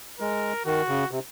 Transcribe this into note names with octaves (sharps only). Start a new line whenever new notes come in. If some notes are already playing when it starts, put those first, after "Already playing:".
G#3 A#4
D#3 F#4
C#3
C3